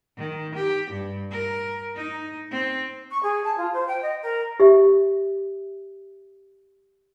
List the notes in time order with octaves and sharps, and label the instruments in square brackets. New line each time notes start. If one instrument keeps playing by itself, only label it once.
[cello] D#3
G4
G2
A#4
D#4
C4
[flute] C#6
G#4
A5
F4
C5
G5
D#5
A#4
[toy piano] G4 E5